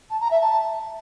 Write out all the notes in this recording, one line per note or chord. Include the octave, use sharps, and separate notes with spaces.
A5
A#5
E5
A5